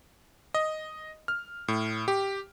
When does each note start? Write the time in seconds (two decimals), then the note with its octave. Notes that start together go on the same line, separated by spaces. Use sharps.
0.54 D#5
1.28 F6
1.68 A2
2.08 G4